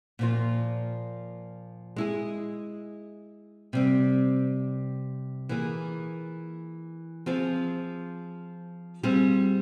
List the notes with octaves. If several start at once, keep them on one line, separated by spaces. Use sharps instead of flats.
A#2 F3 A#3 F4
G#3 E4 G#4
C3 G3 C4
E3 A#3 F4 G#4
F3 C4 F4 G#4
G3 C4 F4 G#4